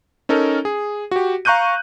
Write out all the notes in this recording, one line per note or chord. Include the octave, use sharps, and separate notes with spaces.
C#4 D#4 A4 A#4
G#4
F#4 G4
F5 A#5 C#6 F#6 G6 D#7